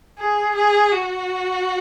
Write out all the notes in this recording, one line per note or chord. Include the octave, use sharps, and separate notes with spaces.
G#4
G#4
F#4